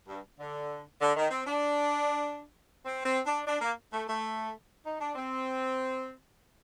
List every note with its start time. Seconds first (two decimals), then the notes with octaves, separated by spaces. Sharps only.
0.08 G2
0.39 D3
1.01 D3
1.16 D#3
1.31 C4
1.47 D4
2.85 C4
3.05 C4
3.26 D4
3.46 D4
3.61 A#3
3.93 A3
4.08 A3
4.85 D#4
5.00 D4
5.15 C4